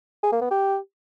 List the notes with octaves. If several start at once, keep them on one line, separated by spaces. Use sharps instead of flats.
G#4
A#3
B3
G4